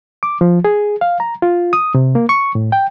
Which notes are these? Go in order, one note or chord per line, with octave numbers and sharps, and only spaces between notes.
D6
F3
G#4
F5
A#5
F4
D#6
C3
A#3
C#6
A2
G5